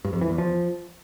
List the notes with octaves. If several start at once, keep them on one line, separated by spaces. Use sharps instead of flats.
G2
F2
E3
E2
F3